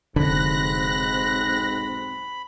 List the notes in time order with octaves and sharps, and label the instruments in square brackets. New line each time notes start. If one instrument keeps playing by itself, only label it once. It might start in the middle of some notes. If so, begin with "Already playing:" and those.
[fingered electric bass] F1 D3 [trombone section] B1 G#2 C4 [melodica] B5 [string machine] F#6 A#6